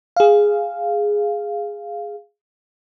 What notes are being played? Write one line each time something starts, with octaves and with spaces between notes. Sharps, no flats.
G#4 F5